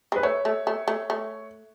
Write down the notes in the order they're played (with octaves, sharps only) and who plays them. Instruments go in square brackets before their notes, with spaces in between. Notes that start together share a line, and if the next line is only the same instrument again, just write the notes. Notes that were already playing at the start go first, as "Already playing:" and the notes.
[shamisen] G#3 [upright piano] B4
[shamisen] A3 [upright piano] C#5
[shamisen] A3
A3
A3
A3